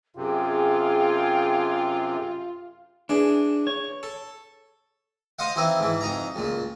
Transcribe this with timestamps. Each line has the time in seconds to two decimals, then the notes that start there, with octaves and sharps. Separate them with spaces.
0.16 F#2 C3 F4 G#4 G5
3.09 E3 D4 G#4
3.67 C#5
4.03 A4
5.39 C5 D#5 F5 F#5
5.56 E3 C4 D#4 E4
5.80 G#2 E3
6.01 F2 D#4 A#5
6.36 C#2 A#2